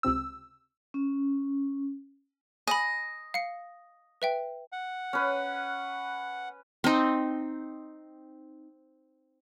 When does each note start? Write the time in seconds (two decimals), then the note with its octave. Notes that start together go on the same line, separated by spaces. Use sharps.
0.03 C#2 C3 C4 E6
0.94 C#4
2.67 D#5 G#5 B5
3.34 F5 C#7
4.22 B4 E5 G5
4.72 F#5
5.13 C#4 B4
6.84 C4 D#4